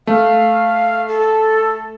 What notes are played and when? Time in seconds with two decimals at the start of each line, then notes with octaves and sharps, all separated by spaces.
0.07 A3 F5
1.08 A4